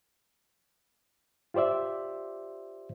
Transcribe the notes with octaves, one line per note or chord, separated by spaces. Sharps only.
F4 G4 C5 D5 E5